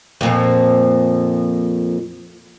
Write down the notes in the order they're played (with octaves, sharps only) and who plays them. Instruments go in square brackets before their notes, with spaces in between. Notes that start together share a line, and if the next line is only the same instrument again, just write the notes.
[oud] F2 A#2 F3